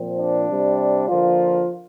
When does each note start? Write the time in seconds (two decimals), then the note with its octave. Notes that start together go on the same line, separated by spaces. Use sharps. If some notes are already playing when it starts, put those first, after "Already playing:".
Already playing: A#2 F3 C4
0.18 D4
0.48 C3 G3 C4
1.08 D3 F3 A#3 F4